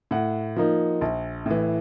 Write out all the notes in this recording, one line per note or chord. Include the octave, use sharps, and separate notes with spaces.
A2 F#5
F3 A#3 D#4
A#1
A2 E3